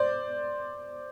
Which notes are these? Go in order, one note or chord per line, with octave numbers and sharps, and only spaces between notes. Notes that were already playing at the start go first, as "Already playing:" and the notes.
Already playing: C5 D5